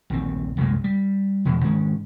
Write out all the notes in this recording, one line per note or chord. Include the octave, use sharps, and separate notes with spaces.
A#1 D#2 C4
C2 F#2 A#2 G#3
G3
E2 B2 F3
G#2 D#3 G#3 C#4